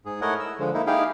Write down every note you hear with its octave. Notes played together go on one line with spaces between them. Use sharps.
G#2 G#4
A3 E4 A#4 C#5 D#5 F#5
E6
D3 F3 G#3
A#3 D#4 E4
D#4 E4 G4 G#4 F5 G5